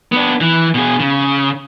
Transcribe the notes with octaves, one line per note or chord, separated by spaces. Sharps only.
B3 D4
E3
B2 G#4
C#3